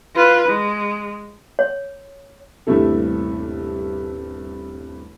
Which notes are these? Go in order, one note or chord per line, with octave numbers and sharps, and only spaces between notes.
F4 B4
G#3
C#5
D#1 G2 C3 A3 E4 A4